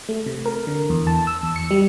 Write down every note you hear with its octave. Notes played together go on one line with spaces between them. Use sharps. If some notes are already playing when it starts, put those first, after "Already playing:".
A3
C3
A#4
D3
E2
A5
E6
E2
C#7
G3